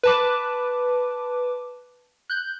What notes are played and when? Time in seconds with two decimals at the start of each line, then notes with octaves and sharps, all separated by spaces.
0.03 B4 A5 D6
2.30 F#6 G6